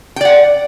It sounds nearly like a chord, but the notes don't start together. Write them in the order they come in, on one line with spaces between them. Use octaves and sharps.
G5 D5 F#5